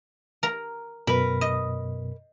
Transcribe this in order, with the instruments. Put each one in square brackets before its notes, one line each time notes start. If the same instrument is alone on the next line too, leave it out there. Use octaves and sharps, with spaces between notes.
[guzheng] A#4 A#5
[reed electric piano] F#2 B2 [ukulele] A#4 B4 [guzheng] B5
[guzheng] D#5